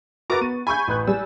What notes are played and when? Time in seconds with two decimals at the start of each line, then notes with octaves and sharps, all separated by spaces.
0.30 F#4 A#4 B4 A#5 C#6 D6 A6
0.41 B3 D#7
0.67 G#5 B5 C#6 G6
0.88 A1 B4 F#6
1.07 G3 G#5 E6